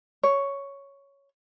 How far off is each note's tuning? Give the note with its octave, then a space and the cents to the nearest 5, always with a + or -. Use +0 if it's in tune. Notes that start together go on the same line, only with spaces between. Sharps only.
C#5 +5